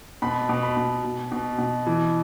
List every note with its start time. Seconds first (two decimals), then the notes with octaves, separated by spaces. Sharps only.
0.22 B2 B5
0.49 B2
0.63 B5
0.77 B2
1.04 B2
1.32 B2
1.58 B2
1.87 E3